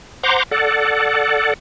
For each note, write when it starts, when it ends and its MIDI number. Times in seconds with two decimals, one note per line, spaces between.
0.23 0.43 72
0.23 0.43 78
0.23 0.43 82
0.23 0.43 84
0.23 0.43 86
0.51 1.54 69
0.51 1.54 74
0.51 1.54 78